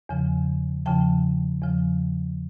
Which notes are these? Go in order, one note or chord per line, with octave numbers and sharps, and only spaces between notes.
E2 C#3 F3
E2 C#3 F3 G5 A5
E2 C#3 F3